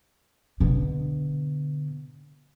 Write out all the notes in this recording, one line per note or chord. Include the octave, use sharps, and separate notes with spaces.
B2 D3